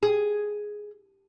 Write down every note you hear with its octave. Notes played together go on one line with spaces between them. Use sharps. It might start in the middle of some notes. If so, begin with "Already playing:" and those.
G#4